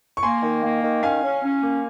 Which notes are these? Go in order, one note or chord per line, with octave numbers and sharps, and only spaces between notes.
C#6
A#3 G#5 C6
D#3
A#3
D#3
C#4 F5 G#5
C#4
C#4
A#3